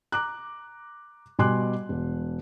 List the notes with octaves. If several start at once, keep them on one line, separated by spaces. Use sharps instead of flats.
A#5 D6 F#6
B2 G3 G#5 C6 D6 F#6
E1